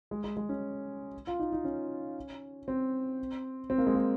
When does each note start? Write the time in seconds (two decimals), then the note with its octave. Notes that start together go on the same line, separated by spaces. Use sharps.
0.11 G#3
0.24 G#3
0.37 G#3
0.49 C#4
1.27 F4
1.39 D#4
1.52 D#4
1.65 C#4
2.68 C4
3.70 C4
3.78 A#3
3.87 G#3
3.95 A#3